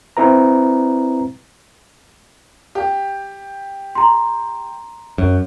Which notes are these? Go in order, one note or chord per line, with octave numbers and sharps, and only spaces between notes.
C4 E4 B4 A#5
G4
A#5 C6
F#2